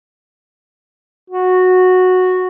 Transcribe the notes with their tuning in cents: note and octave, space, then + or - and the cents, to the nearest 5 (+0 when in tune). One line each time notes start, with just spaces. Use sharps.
F#4 -10